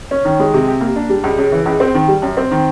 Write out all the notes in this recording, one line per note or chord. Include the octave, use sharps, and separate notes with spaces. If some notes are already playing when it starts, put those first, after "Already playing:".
C#4
D#3
G#3
C3
G4
A#3
D4
G3
C#2
C#3
E3
C#2
C4
D#3
G3
F#2
C4
D#3